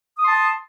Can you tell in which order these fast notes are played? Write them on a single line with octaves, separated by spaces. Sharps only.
D#6 C6 A5